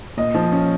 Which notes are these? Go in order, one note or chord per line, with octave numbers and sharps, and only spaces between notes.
A#2 D#5
F3
C#4